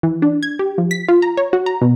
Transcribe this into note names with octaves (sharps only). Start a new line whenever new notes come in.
E3
D4
G#6
G4
F3
B6
F4
A#5
C#5
F#4
A#5
B2